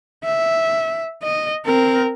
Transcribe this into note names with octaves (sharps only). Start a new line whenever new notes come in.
E5
D#5
C4 A#4